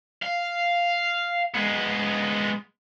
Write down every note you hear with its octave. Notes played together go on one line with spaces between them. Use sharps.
F5
G#3 B3